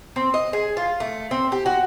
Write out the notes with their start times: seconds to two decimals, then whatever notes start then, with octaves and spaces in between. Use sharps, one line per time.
0.16 C4
0.34 D#5
0.53 G#4
0.77 F4
1.00 A3
1.31 C4
1.52 G4
1.66 F#4